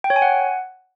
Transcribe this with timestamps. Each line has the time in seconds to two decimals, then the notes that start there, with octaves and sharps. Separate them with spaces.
0.04 G5
0.10 C#5
0.16 G#5
0.22 F#5